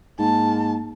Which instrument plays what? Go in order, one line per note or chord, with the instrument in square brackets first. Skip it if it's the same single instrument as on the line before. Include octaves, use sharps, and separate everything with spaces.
[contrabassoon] G#2 [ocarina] A#3 [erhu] A5